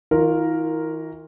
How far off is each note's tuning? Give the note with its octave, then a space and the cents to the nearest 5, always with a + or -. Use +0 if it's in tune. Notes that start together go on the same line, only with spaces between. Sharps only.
E3 -45 F4 +15 A#4 +0